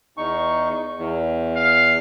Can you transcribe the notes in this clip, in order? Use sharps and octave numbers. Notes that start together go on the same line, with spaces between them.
E2 D#4 C#6
E2
F5